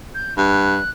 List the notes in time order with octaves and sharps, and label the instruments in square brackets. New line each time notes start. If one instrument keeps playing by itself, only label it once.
[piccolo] G6
[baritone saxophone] G2 [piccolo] F#6